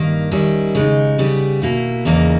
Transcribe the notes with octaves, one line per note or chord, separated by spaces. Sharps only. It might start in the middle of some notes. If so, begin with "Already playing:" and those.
Already playing: G2 D#3 A#3
D#3 G3 C#4 E4
C#3 G#3 D#4
C#3 G3 B3
B2 A#3 E4
E2 C#3 E3 A#3 D#4